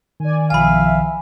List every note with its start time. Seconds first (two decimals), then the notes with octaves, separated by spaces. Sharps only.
0.20 D#3 D5 G#5
0.50 B1 F3 E5 F5 G#5 B5